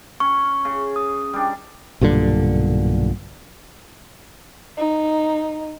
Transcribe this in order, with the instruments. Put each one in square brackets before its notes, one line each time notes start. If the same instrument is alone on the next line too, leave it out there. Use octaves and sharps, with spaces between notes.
[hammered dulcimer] C#4 [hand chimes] C#6
[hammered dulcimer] C#3
[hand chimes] D#6
[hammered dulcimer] G3 D4
[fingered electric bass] B1 G2 A#2 D3
[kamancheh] D#4